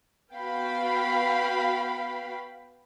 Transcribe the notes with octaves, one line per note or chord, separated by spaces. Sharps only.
B3 F#4 F5 G5 B5